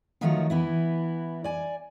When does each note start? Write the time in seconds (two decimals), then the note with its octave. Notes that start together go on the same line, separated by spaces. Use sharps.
0.21 D#3 F3 F#3 A3 F4 F#4
0.50 E3 B3 E4
1.44 D5 G#5